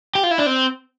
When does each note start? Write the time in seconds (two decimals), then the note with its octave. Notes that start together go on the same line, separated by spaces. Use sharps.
0.15 G4
0.23 F4
0.31 E4
0.38 D4
0.46 C4